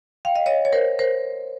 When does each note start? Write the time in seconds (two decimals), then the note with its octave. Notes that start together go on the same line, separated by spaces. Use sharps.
0.25 F5 G5
0.35 D#5 F5
0.46 C#5 D#5
0.65 C#5
0.73 A#4 C5
0.99 A#4 C5